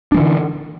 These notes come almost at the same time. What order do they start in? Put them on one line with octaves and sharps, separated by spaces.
D4 G#3 E3 D3